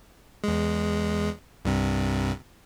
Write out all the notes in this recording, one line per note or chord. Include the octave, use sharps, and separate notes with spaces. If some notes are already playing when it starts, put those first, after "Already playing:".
E2 G#3
C2 G2 C3